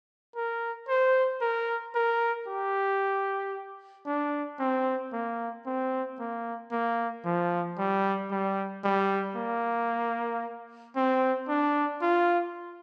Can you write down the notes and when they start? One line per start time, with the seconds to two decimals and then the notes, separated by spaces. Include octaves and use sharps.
0.35 A#4
0.89 C5
1.41 A#4
1.95 A#4
2.48 G4
4.06 D4
4.59 C4
5.12 A#3
5.66 C4
6.19 A#3
6.71 A#3
7.25 F3
7.78 G3
8.31 G3
8.84 G3
9.36 A#3
10.96 C4
11.48 D4
12.02 F4